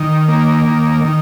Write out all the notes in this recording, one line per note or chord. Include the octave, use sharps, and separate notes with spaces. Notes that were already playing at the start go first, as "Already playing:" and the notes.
Already playing: D#3
A#3
D#3
D#3